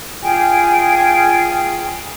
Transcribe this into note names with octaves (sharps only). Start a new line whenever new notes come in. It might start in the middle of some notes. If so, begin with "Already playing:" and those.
F4 G#4 G5 G#5